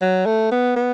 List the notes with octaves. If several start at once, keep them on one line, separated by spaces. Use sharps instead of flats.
F#3
A3
B3
B3